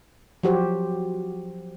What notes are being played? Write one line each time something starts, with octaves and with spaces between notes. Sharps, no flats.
F3 F#3 F#4 G4 C5